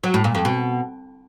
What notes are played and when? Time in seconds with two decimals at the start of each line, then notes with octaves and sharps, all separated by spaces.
0.04 F#3
0.14 A2
0.24 A#2
0.35 F2
0.45 B2